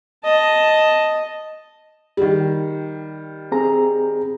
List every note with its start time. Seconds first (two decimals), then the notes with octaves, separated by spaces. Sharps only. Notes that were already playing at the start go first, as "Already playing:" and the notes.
0.25 D#5 A5
2.17 D#3 G3
3.52 C4 G#4 A#5